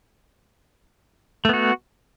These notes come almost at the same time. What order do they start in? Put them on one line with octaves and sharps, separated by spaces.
A3 B3 F#4